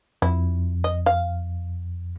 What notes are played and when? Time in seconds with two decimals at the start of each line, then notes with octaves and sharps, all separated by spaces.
0.22 F2 E4
0.84 D#5
1.06 F5